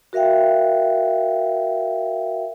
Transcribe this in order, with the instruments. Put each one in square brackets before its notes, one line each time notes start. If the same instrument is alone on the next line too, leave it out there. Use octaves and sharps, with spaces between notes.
[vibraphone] F#4 A#4 E5 F5 G5